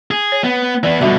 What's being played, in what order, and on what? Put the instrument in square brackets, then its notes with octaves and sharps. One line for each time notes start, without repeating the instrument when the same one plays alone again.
[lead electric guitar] G#4
[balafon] C#5
[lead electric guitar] B3
[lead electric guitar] E3 B3 [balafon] D5
[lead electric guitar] B2 D3 [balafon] G3 F#4 E5